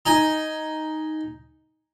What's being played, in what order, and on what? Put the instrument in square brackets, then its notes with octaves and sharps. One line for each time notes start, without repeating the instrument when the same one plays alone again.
[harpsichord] D#4 G#5